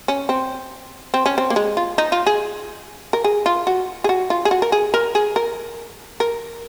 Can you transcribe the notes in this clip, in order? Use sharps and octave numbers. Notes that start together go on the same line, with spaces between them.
C#4
C4
C4
C#4
C4
A#3
G#3
F4
D#4
F4
G#4
A#4
G#4
F4
F#4
G#4
F#4
F4
G#4
F#4
A#4
G#4
A#4
G#4
A#4
A#4